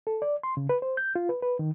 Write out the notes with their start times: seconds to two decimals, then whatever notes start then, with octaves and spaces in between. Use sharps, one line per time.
0.07 A4
0.22 D5
0.43 C6
0.57 C#3
0.69 B4
0.82 C5
0.97 G6
1.15 F4
1.29 B4
1.42 B4
1.59 D#3